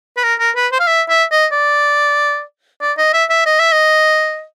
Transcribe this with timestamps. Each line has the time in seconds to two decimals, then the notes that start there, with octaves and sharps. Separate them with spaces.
0.17 B4
0.23 A#4
0.39 A#4
0.56 B4
0.72 C5
0.80 F5
0.87 E5
1.09 E5
1.31 D#5
1.52 D5
2.81 D5
2.98 D#5
3.13 E5
3.30 E5
3.46 D#5
3.60 E5
3.72 D#5